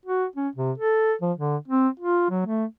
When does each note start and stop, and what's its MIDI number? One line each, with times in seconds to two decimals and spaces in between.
0.05 0.25 66
0.36 0.48 61
0.56 0.72 48
0.78 1.13 69
1.21 1.32 53
1.37 1.56 50
1.68 1.88 60
2.00 2.28 65
2.30 2.43 54
2.46 2.65 57